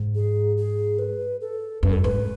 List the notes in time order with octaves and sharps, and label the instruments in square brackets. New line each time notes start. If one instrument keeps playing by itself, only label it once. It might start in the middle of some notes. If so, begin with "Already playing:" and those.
Already playing: [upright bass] G#2
[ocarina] G#4
G#4
B4
A4
[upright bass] F#2 [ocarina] B4
[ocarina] A4
[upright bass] G#2 [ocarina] B4